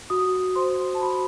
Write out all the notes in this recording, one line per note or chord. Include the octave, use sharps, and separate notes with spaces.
F#4 D#6
C5 C6
A5
F#4 B5